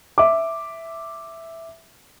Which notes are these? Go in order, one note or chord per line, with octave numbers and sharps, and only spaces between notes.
E5 D6